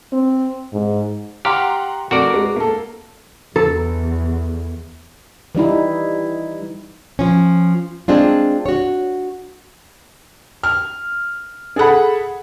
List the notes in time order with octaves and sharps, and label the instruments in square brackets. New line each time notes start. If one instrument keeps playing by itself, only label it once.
[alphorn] C4
G#2
[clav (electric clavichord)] G4 F5 [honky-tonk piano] F#5 A#5 C6
[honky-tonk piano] F2 A3 [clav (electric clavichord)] F#4 A#4 D5
[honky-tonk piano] G#3
A#3 A4
[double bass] E2 [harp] A4
[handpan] E3 G3 D#4 E4
[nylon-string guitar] F3 C#4
G#3 C4 D4 F4
F#4 C#5
[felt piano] F6
G#4 A4 F#5 B5